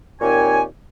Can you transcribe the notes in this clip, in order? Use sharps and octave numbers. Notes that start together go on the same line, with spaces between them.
D#2 A#2 C4 G4 C#5 G#5